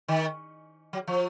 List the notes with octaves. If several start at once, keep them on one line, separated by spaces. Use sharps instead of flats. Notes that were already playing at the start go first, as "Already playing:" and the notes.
D#3
F#3
F3